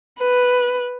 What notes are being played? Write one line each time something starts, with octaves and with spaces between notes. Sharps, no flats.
B4